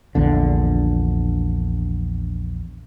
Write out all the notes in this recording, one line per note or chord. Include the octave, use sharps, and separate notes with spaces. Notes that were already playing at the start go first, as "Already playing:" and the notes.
A#1 E2 D3